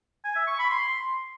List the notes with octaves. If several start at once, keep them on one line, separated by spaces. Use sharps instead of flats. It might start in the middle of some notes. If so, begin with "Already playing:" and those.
G#5
E5
C#6
B5
C6